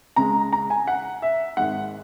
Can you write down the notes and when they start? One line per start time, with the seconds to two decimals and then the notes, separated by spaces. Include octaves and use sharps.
0.16 C#2 C#3 G#3 A#5
0.53 A#5
0.70 G#5
0.88 F#5
1.22 E5
1.57 G#1 G#2 D#3 G#3 F#5